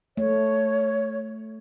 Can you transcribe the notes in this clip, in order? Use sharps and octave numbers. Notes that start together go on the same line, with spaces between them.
A3 C#5